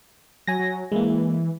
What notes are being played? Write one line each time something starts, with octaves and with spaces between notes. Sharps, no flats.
F#3 G#5 A#6
F#3
E3 G#3 A#3